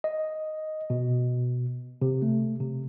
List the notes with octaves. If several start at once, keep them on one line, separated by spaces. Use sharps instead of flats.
D#5
B2
C3
A3
C3